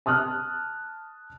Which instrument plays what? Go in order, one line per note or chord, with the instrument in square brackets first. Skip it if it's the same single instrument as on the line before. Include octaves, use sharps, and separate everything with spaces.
[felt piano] A5 D#6 F6 F#6